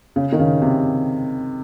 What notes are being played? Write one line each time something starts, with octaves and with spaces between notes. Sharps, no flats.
C#3
D#3
C#3
C3